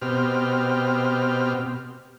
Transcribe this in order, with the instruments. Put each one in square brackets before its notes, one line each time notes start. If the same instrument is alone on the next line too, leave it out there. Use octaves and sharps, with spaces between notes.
[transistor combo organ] B2 C4 G4 F6